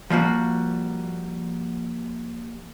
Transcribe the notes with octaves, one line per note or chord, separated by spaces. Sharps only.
F3 G3 A#3 F#4